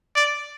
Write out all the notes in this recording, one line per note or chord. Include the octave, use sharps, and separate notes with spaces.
D5